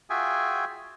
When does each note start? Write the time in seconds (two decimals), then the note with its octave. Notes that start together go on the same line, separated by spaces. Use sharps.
0.10 F4 F#4 G#4 E5 G5 G#5